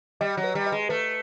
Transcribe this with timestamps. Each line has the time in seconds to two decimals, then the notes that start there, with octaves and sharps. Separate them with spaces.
0.21 G3 D#5
0.37 F#3
0.44 B4
0.55 G3
0.66 D#5
0.72 G#3
0.89 A3 B4